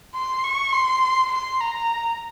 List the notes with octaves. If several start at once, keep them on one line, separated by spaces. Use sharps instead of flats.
C6
C#6
C6
C6
A#5